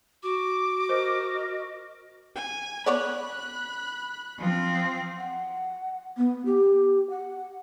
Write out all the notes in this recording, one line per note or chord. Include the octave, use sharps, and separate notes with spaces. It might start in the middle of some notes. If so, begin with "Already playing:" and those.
F#4 D6
A#4 C5 D#5
G#5
B3 C#5 D5 B5 F#6
F3 C4
F#5
B3
G4
F#5